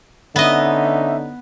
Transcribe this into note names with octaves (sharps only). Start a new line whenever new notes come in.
D3 B3 C#4 D#4 D#5 E5